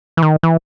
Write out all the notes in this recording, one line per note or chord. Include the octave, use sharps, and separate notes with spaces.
E3
D#3
E3